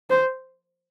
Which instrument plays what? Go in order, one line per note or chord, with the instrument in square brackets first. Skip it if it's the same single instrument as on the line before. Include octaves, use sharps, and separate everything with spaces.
[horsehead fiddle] C5